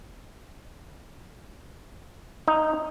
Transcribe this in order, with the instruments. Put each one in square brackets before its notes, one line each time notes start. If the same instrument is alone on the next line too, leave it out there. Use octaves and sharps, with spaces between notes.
[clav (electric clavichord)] D#4